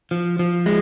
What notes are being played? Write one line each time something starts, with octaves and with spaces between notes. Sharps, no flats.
F3
F3
G#3